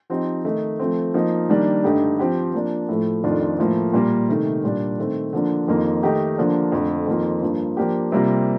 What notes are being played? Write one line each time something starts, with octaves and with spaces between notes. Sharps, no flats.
F3 C4 D#4 G4
D#3 A3 D#4
F3 A3 C4
F3 A#3 D#4
D#3 G3 A#3 D4
G2 D3 A3 D#4 G4
F3 C4 G4
F3 A#3 D4
A2 F3 A3
F2 D#3 A3 D4 F4
A2 F3 A#3
A#2 G3 A#3
C3 D#3 A3
A#2 G3 D4
D#3 A3 C4
D3 F3 A#3 D4
F2 D#3 A#3 F4
D#3 A3 D#4 G4
D3 F3 A#3 D4
F2 D3 A3
F2 D#3 A#3 F4
G2 F3 A#3
F3 A#3 D4 G4
C3 G3 A#3 F4